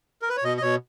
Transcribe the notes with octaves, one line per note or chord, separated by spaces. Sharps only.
A#4
B4
C#5
B2 D#5
D#5
B2 C#5